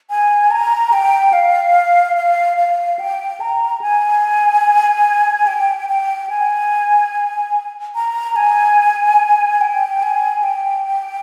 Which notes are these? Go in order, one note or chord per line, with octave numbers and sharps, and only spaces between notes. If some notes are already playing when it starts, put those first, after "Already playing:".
G#5
A#5
G5
F5
F5
F5
G5
A#5
G#5
G5
G5
G#5
A#5
G#5
G5
G#5
G5